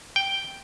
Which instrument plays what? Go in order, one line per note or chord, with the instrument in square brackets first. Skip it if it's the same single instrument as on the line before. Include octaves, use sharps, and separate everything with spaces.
[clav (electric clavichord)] G5